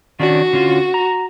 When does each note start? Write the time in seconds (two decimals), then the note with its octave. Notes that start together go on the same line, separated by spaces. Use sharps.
0.19 D#3 C#4 D4 F#4
0.53 D3 C#4 F4
0.94 A#5